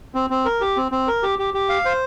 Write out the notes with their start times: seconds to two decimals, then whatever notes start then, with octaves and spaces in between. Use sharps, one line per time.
0.15 C4
0.30 C4
0.45 A#4
0.61 G4
0.77 C4
0.92 C4
1.08 A#4
1.23 G4
1.39 G4
1.54 G4
1.69 F5
1.85 C5